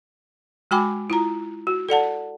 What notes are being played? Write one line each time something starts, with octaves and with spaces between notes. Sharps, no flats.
G#3 F#4 G5 G#5 B5 D6
E4 F4 A#5
F#4
A4 D5 F#5 A5